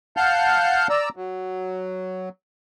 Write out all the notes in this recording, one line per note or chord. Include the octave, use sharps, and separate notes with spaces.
F5 F#5 A5 F6 G6
D5 A#5 E6
F#3